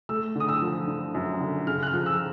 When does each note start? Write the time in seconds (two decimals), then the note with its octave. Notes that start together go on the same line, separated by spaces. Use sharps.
0.09 A3 E6
0.35 D3 D#6
0.49 E6
0.62 F3
0.88 D3
1.15 F#2
1.40 D3
1.67 C#3 F6
1.83 F#6
1.87 F6
1.93 F3
2.06 E6